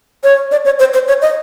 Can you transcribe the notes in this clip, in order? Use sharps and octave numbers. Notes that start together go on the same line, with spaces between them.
C#5
D5
C#5
C5
C5
C#5
D#5